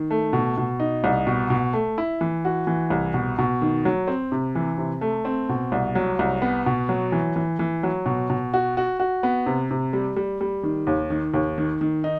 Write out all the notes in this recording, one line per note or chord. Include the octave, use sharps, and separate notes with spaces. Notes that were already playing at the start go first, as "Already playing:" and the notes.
Already playing: D#3
A3
B2
B2
D#4
C2
B2
B2
A3
E4
E3
F#4
E3
C2
B2
B2
D#3
F#3
C4
C3
E3
C3
A3
C4
B2
C2
F#3
C2
B3
B2
F#3
E3
E3
E3
F#3
B2
B2
F#4
F#4
F#4
B3
C3
C3
G3
G3
G3
D#3
D#2
D#3
D#2
D#3
D#3
D#4